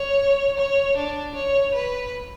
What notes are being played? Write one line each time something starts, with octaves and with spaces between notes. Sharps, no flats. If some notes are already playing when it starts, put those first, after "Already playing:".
Already playing: C#5
C#5
D4
C#5
B4